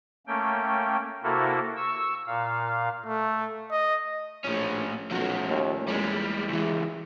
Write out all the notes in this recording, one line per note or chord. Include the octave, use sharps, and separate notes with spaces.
A3 A#3 C#4 G5
C3 A#3 E4 F#4 A4 A#4
C#6 E6
A#2 F5
A3
D#5
A#1 A2 C#4
B1 A#2 F3 A3 C#4 F#4
D#2
E2 G3 G#3
C#2 E3 E4 G#4